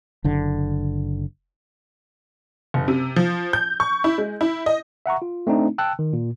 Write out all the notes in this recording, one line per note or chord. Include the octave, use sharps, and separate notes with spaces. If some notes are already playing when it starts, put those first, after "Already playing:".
F#1 D3
F#1
C3
F3
G6
C#6
E4
G#3
E4
D#5
E5 F#5 A#5 C#6
F4
A3 C4 D4 D#4
G5 A5 E6 F#6
D#3
A#2